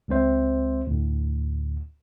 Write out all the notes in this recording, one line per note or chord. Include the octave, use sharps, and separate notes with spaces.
C#2 G#3 C4 C5 E5
D2 A2